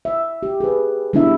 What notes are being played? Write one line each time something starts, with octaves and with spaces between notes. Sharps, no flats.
E5
G4
G#4 B4
G3 B3 D4 E4 E5